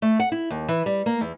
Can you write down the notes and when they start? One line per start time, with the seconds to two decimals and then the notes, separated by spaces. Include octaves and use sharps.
0.02 A3
0.20 F#5
0.32 E4
0.50 D#2
0.68 E3
0.86 G3
1.06 A#3
1.21 E2